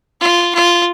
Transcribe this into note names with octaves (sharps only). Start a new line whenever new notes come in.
F4
F4